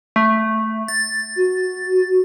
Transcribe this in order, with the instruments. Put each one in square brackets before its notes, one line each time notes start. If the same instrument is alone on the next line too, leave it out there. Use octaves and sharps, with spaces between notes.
[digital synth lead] A3
A6
[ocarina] F#4